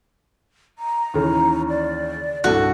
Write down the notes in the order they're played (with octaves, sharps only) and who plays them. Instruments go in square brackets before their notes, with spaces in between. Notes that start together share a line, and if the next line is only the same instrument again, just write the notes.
[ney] A#5
[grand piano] D#2 C#3 E3
[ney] D5
[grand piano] C2 G2 [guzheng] F#4 [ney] A4